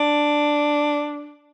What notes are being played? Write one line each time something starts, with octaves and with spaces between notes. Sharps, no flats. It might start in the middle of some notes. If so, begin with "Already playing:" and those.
Already playing: D4